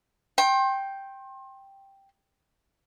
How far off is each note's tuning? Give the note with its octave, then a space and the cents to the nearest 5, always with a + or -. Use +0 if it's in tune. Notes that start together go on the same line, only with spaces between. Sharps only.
G5 +0 C6 +35